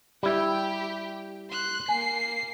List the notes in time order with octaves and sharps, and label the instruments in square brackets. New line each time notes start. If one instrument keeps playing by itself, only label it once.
[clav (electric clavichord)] G3 E4 [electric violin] G4 G5
[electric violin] C6 F#6
[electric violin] A#3 C7 [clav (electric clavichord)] G#5